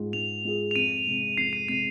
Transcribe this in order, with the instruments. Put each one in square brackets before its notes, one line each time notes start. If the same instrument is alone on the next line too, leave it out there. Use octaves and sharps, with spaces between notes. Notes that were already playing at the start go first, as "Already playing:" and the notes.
Already playing: [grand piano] G#2 G#3 F4 G#4
[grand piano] G#2 [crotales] F7
[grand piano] G#3 F4 G#4
[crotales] F7
[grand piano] F2 [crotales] D#7
[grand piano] C3 G#3
[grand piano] F2 [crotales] C7
[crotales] D#7
[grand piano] C3 G#3 [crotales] D#7